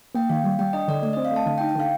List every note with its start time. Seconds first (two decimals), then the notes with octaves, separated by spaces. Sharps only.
0.14 A#3 G5
0.30 D#3 F5
0.44 G3
0.59 G3 G5
0.73 D4 D#5
0.88 D3 D5
1.02 A3 D5
1.13 C4 D#5
1.25 F5
1.32 A3 A5
1.46 D3 A5
1.58 G5
1.61 D#4
1.69 G5
1.76 D3 F5